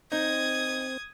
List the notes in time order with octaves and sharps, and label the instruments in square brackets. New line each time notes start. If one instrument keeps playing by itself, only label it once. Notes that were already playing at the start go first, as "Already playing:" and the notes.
[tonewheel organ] C4 [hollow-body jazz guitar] D#4 [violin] D#6 G#6